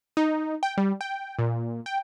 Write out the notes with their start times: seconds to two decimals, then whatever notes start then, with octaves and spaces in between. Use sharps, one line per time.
0.17 D#4
0.63 G5
0.78 G3
1.01 G5
1.39 A#2
1.86 G5